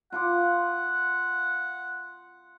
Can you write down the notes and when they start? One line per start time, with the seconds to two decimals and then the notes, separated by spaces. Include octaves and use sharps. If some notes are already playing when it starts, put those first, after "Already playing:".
0.12 F4 F#5 C6 D6